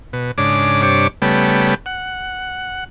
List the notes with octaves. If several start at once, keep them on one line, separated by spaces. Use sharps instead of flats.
B2
G#2 C#3 D4 D6
G2 C3 D4 C#5 D6
C#3 G3 A3 B3
F#5